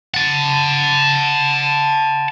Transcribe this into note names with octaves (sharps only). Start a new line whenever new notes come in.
F#5 A5